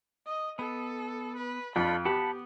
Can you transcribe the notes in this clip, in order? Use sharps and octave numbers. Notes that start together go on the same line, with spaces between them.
D#5
B3 A4
B4
F2 D4 F4 A4 B5
B3 G4 F#5 A5 B5